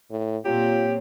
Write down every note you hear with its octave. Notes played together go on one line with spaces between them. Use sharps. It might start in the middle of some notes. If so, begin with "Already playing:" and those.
A2
A#2 F#3 C4 F4 G4